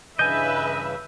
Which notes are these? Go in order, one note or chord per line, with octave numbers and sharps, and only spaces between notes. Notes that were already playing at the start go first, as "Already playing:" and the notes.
G2 C#3 E3 B4 D#5 E5 G#5 G6